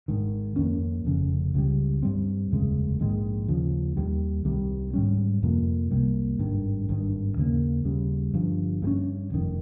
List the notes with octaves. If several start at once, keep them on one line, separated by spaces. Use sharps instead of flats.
G#1 G#2 D#3
F2 D#3 A#3 C#4
F1 F2 C#3
C#2 C#3 G3
G2 G3 C4
F1 D#2 C#3 G#3
A#1 G#2 D#3 G#3
D#2 C#3 F3
D#2 D#3 G3
C2 C3 D#3 G3
G#2 G3 C#4
F2 C3 F3 A#3
C2 C3 G3 A#3
G#1 G2 D#3
G#1 G2 D#3
D#2 C#3 F3 A#3
D#2 C#3 G3
G1 G2 F3
G2 G3 C#4
F1 F2 D#3